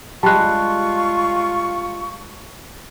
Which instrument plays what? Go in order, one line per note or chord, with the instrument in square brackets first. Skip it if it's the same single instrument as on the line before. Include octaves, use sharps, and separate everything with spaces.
[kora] G3 G#3 [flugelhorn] F4 [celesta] A5 F#6 [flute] C#6